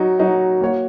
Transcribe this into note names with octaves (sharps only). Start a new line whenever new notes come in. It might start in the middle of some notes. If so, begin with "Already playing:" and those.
Already playing: F#3 D#4 F#4
F#3 D#4 F#4
A#3 F#4 C#5